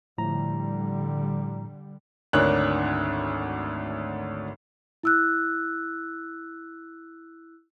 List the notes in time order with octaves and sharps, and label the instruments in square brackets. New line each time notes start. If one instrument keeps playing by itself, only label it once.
[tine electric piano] A2 F3 A#5 [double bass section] D3 G3
[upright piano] G#1 D2 D4 A#4 C#5 F#6
[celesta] E4 E6 F#6